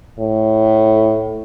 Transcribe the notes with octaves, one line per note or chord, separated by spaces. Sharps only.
A2